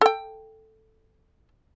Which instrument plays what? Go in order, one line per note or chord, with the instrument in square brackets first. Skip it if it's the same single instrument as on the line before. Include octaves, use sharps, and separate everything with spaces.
[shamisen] A4 G5